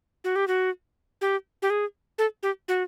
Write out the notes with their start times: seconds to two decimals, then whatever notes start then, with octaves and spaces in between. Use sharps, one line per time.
0.24 F#4
0.36 G4
0.48 F#4
1.21 G4
1.62 G4
1.70 G#4
2.18 A4
2.43 G4
2.68 F#4